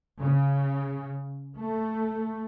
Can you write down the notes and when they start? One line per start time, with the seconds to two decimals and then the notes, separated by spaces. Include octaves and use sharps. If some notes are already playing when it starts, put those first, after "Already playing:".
0.20 C#3
1.59 A3